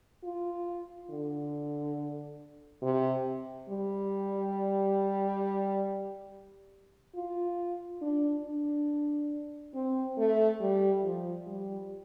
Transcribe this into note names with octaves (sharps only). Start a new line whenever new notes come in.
F4
D3
C3
G3
F4
D4
D4
C4
A3
G3
F3
G3